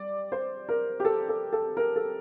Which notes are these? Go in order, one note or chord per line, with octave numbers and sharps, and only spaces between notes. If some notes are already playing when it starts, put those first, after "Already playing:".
Already playing: G3 D5
C5
A#4
G4
A4
A4
A4
A#4
A4